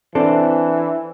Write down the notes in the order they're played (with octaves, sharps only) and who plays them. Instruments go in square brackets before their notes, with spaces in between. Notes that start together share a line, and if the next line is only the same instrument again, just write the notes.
[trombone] E3 [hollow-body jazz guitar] C4 D4 A4